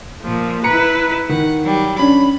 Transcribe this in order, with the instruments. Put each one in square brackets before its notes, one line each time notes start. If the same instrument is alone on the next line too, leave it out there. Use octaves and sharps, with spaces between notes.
[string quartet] A#2 F3
[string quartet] E4 B4 [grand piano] A#5 C#7
[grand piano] D#3 [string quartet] F#5
[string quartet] F#3 G3
[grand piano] C#4 D4 [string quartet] B5